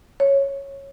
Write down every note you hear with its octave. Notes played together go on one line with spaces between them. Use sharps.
C#5